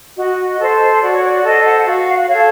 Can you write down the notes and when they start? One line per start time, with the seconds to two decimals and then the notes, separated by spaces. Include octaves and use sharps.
0.17 F#4 D#5
0.59 A4 C5
1.01 F#4 D5
1.12 C#5
1.23 D5
1.44 A4 C5 D#5
1.65 F#5
1.86 F#4 F5
2.28 A4 C#5 F5